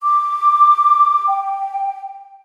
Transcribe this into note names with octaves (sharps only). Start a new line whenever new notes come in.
D6
G5